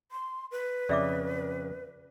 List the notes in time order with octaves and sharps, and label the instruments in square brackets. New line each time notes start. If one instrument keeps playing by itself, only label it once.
[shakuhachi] C6
B4
[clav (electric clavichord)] F2 C#3 [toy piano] D5 E5 D6